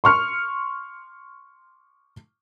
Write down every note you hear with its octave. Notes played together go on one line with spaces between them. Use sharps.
C6 C#6 F6 C#7